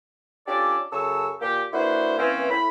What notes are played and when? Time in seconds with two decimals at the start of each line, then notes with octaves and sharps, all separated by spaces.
0.48 C#4 D4 F4 G4 A4 D5
0.92 F#2 C#3 A4 A5 C#6 E6
1.41 A#2 A#3 G4
1.73 A#3 D4 E4 F#4 B4 C5
2.18 E3 A#3 C4 C#4
2.50 A2 B5